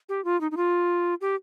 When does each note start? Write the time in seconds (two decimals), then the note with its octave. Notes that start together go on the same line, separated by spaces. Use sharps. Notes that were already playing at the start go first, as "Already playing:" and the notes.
0.09 G4
0.25 F4
0.41 D#4
0.51 D#4
0.57 F4
1.21 G4